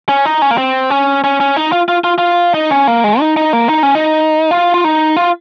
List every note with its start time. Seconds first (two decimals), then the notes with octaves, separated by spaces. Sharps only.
0.09 C#4
0.25 D#4
0.42 C#4
0.51 A#3
0.58 C4
0.90 C#4
1.24 C#4
1.40 C#4
1.56 D#4
1.72 F4
1.89 F4
2.04 F4
2.18 F4
2.54 D#4
2.71 C#4
2.87 A#3
3.04 G#3
3.20 D#4
3.37 D#4
3.53 A#3
3.69 D#4
3.83 C#4
3.95 D#4
4.51 F4
4.74 F4
4.84 D#4
5.16 F4